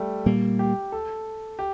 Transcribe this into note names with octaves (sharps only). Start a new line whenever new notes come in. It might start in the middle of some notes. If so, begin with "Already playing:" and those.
Already playing: G3 A3
A#2 G3 A#3
G4
A4
G4